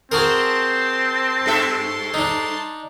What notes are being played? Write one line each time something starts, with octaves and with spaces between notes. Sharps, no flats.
C4 F#4 G#4 A#4 A5 C6
G2 A4 E5
D4 D#4